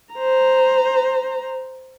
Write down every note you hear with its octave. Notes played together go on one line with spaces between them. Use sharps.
C5 A#5